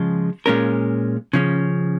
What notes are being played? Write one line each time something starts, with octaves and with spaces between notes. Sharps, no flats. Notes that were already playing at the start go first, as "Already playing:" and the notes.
Already playing: C#3 F3 G#3 F4
A#2 G#3 C#4 F4 A#4
C#3 F3 C#4